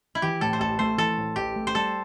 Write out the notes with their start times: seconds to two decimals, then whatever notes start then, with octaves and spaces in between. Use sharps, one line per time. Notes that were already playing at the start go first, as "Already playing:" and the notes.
0.15 E4
0.22 E3 G4
0.41 A2 A4
0.53 C5
0.60 A1 A4
0.79 A3 C5
0.98 E3 A4
1.18 A2
1.36 A1 G4
1.56 A3
1.67 C5
1.74 G3 A4